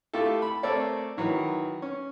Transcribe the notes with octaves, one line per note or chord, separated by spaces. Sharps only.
A3 E4 F4 G4 A4
B5
A3 C4 A4 A#4 C#5 D5
D#3 E3 F#3 E4
C#4